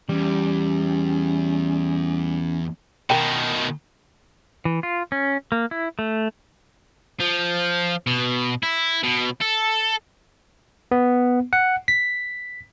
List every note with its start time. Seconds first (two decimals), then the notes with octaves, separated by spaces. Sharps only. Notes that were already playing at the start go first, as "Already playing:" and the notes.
0.09 E2 G3 C#4
3.10 B2 D#3 A#4 G5
4.65 E3
4.83 F4
5.12 C#4
5.52 A#3
5.71 E4
5.99 A3
7.20 F3
8.07 B2
8.63 E4
9.03 B2
9.41 A4
10.91 B3
11.53 F#5
11.88 B6